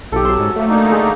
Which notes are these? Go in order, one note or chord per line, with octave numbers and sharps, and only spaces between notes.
B1 G4 A4
F#3 C6 E6
G#2 C#4
F3 A3 A#3
D3 A#3 D#4
G#4